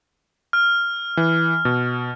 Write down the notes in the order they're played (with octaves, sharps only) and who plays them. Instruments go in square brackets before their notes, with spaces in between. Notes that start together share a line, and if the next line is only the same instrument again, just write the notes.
[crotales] F6
[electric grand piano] E3
B2